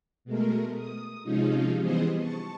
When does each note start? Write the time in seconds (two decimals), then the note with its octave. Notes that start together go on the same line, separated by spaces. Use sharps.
0.25 B2 G#3 A3 A#4
0.74 D#6
1.23 C3 F3 G#3 C#4 D#4 F4
1.78 E3 G3 B3 G#4 C5 D#5
2.17 A5 C#6